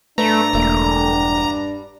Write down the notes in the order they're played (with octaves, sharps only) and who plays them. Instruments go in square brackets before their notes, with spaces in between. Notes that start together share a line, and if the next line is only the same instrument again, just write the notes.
[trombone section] G2 D4 [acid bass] A3 [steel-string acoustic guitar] B4 D5 [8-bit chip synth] A#5
[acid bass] E1 [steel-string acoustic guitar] D3 A3 A#3
[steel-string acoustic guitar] G3